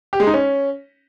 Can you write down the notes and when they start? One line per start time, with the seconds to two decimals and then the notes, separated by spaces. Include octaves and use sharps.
0.13 G4
0.20 G#3
0.27 D#4
0.34 C#4